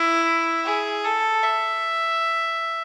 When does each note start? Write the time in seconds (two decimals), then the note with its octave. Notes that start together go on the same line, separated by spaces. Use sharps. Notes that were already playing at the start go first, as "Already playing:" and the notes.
Already playing: E4
0.65 G#4
1.04 A4
1.44 E5